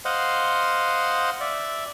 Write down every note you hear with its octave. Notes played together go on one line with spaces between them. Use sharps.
C5 D#5 F5 F#5 C6
D5 E5